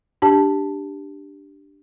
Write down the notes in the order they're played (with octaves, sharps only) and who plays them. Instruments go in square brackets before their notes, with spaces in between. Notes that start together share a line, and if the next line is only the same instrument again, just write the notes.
[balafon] D4 G4 A5